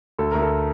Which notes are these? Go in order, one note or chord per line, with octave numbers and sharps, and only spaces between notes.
D2 A4
D2 A#4
A4